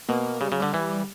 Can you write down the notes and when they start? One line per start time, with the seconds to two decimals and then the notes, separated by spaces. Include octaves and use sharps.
0.09 B2 A#3
0.40 C#3 G3
0.51 C#3 F#3
0.60 D3 G3
0.74 E3